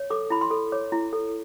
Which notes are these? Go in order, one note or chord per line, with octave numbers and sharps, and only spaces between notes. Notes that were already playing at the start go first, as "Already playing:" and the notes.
Already playing: C#5
A4 D6
E4 B5
C6
A4
C#5 D6
E4
A4